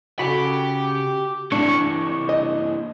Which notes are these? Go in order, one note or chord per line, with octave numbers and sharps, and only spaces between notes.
C#3 F#4 G4 A4 G5 B5
E3 A#3 D4 C#6
D#5